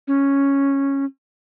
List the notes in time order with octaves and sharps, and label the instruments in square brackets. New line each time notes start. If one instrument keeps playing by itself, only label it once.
[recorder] C#4